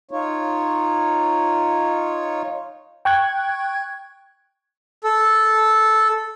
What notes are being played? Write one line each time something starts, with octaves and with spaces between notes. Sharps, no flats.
D#4 F4 C#5
G5 C#6 F#6 G#6
A4